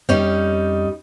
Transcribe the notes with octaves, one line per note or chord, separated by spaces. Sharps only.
F2 G3 C#4 D#4